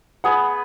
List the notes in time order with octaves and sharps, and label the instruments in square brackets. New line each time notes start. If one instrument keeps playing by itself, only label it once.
[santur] B3 G#4 B4 [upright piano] F#5